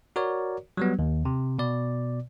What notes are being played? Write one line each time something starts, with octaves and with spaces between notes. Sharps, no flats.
F#4 A#4 C#5 D5
F#3 G3 B3
D#2
C3
B2 D5